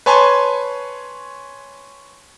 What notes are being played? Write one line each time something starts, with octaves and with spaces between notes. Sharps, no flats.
B4 C#5 G#5 A5 C6 C#6